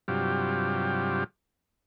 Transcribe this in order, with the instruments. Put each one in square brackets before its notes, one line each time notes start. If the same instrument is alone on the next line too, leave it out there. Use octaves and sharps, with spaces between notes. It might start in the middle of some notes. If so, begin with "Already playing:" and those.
[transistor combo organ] G2 C3 F#3 F4 G4